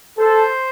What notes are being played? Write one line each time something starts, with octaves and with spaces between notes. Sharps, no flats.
A4 C5